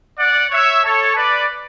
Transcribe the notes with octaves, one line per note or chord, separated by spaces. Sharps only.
D5 F#5
C#5 E5
A4 C#5
B4 D5